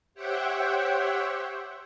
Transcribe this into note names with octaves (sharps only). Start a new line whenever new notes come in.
G4 C5 C#5 E5 F#5 G5